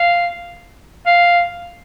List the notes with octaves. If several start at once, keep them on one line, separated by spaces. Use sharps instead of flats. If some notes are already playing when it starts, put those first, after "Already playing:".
Already playing: F5
F5